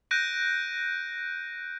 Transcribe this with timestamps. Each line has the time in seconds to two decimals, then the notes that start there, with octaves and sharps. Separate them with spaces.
0.11 F#6 G6 A#6 D7 D#7